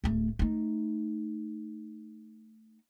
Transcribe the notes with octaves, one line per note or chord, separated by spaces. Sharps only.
D1 A3
A3 D#4